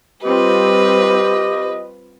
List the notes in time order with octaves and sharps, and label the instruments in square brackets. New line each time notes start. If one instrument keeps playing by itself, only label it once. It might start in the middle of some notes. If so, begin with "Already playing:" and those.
[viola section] G3 C4 F4 [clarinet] G4 [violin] B4 [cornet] D#5